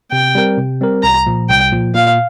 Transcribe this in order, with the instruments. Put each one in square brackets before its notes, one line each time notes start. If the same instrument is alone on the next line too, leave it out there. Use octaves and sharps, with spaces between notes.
[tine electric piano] C3 [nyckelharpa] G5
[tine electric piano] G3 C4 A#4
C3
G3 C4 A#4
[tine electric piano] C2 [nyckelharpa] A#5
[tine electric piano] A#2 F3
[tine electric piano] C2 [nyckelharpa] G5
[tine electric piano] A#2 F3
[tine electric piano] A#2 [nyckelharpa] F5